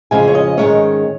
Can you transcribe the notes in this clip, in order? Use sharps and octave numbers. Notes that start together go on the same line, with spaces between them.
F2 C#3 F3 G#3 G#5
C#5
D#5
G#2 D#3 G#3 C#4 C#5